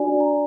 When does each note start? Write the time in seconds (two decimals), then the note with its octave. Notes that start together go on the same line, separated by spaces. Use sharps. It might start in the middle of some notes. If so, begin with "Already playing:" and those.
Already playing: D4 F#4 D5 G#5
0.20 A#5